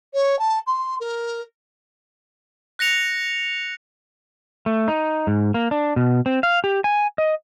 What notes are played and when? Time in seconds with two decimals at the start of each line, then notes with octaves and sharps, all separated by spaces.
0.14 C#5
0.39 A5
0.67 C6
1.00 A#4
2.79 F#6 A#6 C#7 F7
4.66 A3
4.88 D#4
5.27 G#2
5.54 A#3
5.71 D4
5.96 B2
6.26 C4
6.43 F5
6.64 G4
6.84 G#5
7.18 D#5